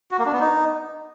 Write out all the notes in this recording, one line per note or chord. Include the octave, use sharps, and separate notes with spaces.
F#4
A#3
D4
B3
D#4